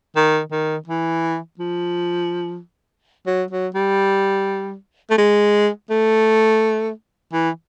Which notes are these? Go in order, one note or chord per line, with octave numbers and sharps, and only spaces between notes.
D#3
D#3
E3
F3
F#3
F#3
G3
A3
G#3
A3
E3